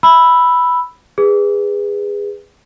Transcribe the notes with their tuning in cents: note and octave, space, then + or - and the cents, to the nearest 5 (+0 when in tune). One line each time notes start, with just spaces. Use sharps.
B5 +0 E6 +0
G#4 -25 B4 +0